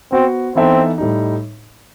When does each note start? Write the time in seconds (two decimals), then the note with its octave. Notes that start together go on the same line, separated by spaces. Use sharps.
0.12 B3 C4 F#4 C5
0.55 E3 B3 C4 D#4 A4 E5
0.98 A2 G3 D#4